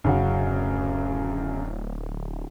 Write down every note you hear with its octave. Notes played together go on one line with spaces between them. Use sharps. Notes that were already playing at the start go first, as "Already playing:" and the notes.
D1 F#2 C#3 F#4